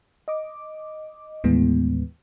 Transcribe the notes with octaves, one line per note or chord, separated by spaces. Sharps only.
D#5 D6
D#2 A2 E3 G#3 B3